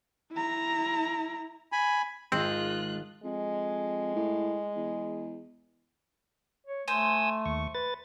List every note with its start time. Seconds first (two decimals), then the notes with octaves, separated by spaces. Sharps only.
0.32 E4 A#5
1.72 G#5 B5
2.32 G#1 G#3 C4 F4 F#6
3.24 F2 G#3
4.16 A2
4.76 E2
6.67 C#5
6.88 A3 C5 G#5 D#6 E6
7.46 D#2 C#6
7.75 B4 A6